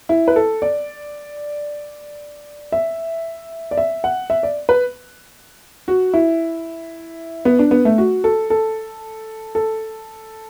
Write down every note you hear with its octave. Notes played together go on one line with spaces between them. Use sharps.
E4
B4
A4
D5
E5
D5
E5
F#5
E5
D5
B4
F#4
E4
B3
D4
B3
A3
F#4
A4
A4
A4